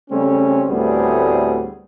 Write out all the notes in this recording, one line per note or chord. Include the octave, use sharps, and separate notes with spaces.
C#3 G3 A3 C4 C#4
D2 A2 G3 B3 C4 G#4